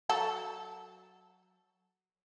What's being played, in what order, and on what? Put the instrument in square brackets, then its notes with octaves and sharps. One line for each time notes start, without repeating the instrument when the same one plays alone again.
[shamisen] F#3 A4 A5